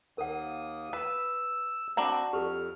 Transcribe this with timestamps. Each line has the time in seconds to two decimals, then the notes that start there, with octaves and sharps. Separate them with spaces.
0.18 D#2 A#3 A#4 F#5 D#6
0.93 B4 E6
1.97 C4 D4 F#4 F#5 A#5 B5
2.33 F2 G4 A4 F6